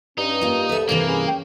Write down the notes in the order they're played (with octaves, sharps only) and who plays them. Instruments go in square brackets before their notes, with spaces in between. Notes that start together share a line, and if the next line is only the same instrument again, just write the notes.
[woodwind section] G2 [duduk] C#4 [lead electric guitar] D#4
[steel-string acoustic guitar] A#3 F4
[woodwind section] C2 [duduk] A4 [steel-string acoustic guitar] B4 E5
[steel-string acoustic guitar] G2 C3 E3 [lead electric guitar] A#3
[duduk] C#4 [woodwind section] G#4 B4
[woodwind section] G5